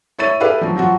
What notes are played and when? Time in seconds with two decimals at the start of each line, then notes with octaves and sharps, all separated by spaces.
0.19 E4 C#5 A6 D#7
0.40 E4 G4 A4 B4 D5 F5
0.61 F3 F#3
0.75 F3 F#3 F4 F#4